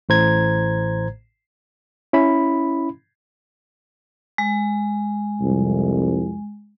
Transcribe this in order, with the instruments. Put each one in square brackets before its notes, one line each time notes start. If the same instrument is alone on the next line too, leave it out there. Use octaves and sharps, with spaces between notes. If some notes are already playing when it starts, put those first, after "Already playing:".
[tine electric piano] A1 A2 C5 A#5 G#6
[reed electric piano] C#4 E4 B5
[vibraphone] G#3
[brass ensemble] C2 F2